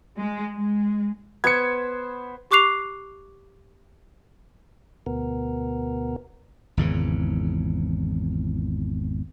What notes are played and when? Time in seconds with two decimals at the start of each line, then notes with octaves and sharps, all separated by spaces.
0.17 G#3
0.55 G#3
1.44 B3 C5 E6 G#6 C#7
2.51 G4 C#6 D6 F#6 C7 F7
5.06 D2 B2 B3 A#4
6.77 G#1 E2 C#3 E3